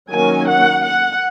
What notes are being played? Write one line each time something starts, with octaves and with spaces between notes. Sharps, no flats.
D#3 F#3 A#3 C#4 G#5
F#5
F#5